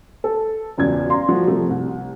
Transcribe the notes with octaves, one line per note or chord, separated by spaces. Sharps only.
A4
E1 C#2 F#2 D5 G#6
D5 F5 A#5 C6
F3 A3 F#4
C3 F3 A3
C2